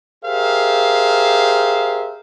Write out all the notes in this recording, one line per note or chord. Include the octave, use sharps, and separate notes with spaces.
G4 G#4 A#4 C5 E5 F5